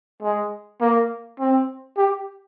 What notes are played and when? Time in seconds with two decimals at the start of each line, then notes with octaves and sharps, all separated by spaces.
0.23 G#3
0.81 A#3
1.40 C4
1.97 G4